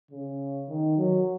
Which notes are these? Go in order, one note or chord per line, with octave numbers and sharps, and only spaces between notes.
C#3
D#3
F#3